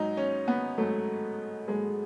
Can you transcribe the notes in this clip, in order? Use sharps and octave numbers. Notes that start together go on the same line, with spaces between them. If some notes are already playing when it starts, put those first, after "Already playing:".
Already playing: G#2 F#3 D#4
C#4
B3
G#2 F#3 A3
G#2 F#3 G#3